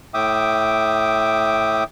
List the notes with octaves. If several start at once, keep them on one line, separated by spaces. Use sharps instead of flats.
A2 E5 G5 D6 D#6